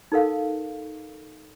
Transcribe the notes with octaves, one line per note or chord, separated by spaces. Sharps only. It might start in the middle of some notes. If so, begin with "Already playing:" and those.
D#4 A4 A#4 F5